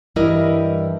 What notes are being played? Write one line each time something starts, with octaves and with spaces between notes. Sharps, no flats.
G2 E3 G3 E4 A#4 D#5